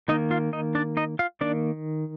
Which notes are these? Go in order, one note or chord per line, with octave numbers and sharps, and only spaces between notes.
D#3 A#3 D#4 D#5
F4 F5
D#4 D#5
D4 D5
D#4 D#5
F4 F5
D#3 A#3 D4 D5